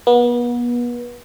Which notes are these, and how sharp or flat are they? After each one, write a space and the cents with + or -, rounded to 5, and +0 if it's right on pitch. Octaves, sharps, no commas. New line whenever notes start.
B3 -35